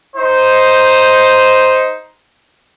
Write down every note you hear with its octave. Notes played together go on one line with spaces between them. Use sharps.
D#4 C5